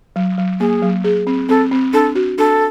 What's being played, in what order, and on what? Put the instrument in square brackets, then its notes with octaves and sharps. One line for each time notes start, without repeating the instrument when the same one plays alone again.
[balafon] F#3
F#3
[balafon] A#3 [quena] G#4
[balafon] F#3
G#4
C4
[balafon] C4 [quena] A4
[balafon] C4
[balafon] D4 [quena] A4
[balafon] F#4
[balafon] D4 [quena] A4